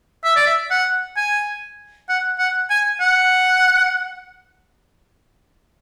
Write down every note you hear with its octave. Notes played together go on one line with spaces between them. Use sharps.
E5
D5
E5
F#5
G#5
F#5
F#5
G#5
F#5